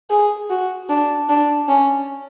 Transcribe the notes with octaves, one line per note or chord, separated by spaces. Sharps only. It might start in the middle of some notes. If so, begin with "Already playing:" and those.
G#4
F#4
D4
D4
C#4